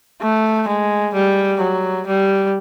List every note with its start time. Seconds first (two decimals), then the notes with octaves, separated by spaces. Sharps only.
0.22 A3
0.68 G#3
1.15 G3
1.60 F#3
2.07 G3